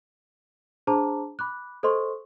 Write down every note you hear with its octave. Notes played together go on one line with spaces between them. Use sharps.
D4 G#4 C5 A5 A#5 D6
B5 D6 F#6
A4 C5 D#5 C6 C#6